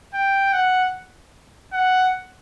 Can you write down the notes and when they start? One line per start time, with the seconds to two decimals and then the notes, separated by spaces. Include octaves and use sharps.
0.14 G5
0.53 F#5
1.73 F#5